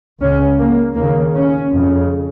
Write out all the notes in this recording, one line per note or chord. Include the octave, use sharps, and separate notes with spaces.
C#2 C#3 C#4
A#3
D#2 C#3 A#3
C#4
F2 C#3